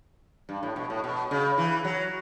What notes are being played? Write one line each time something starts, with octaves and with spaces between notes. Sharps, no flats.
G2
A2
B2
A2
B2
C#3
E3
F#3